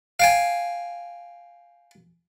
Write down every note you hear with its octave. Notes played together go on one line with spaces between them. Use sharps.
F5 G5 G#5